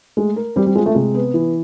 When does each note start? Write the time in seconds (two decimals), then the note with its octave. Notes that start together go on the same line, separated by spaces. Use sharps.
0.17 G#3 A3
0.36 A#4
0.56 G3 C4
0.66 G3
0.75 G#3 F4
0.86 A3
0.95 C3 G#3
1.14 B3
1.34 E3